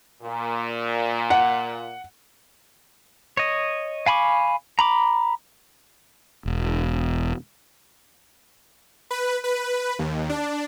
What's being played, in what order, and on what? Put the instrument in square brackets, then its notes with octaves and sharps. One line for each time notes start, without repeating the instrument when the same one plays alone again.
[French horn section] A#2
[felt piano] F#5
[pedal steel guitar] C#5 D#5
F5 G#5 B5 C#6 D6
A#5 B5 D6
[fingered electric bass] E1
[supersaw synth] B4
B4
D#2
D4